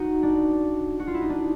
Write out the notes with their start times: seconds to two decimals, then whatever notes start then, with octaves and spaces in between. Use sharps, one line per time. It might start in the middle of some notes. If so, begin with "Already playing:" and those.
Already playing: D#4 F#4
0.23 D4
0.99 F#4
1.07 F4
1.14 E4
1.22 D#4
1.29 D4